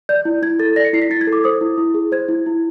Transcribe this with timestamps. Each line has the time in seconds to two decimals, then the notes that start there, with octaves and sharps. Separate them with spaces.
0.09 D5 G6
0.25 E4
0.42 E4 G#6
0.59 A4 A6
0.76 D5 A#6
0.85 C#7
0.93 E4 C7
1.02 B6
1.10 E4 A6
1.21 G#6
1.27 A4
1.32 D6
1.44 C5 D#6
1.61 E4
1.78 E4
1.94 G#4
2.12 C5 G#6
2.29 E4
2.46 E4